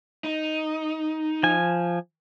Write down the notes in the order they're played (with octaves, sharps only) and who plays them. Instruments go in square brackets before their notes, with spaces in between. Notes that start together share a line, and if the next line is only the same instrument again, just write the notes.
[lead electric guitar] D#4
[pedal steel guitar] F3 G#5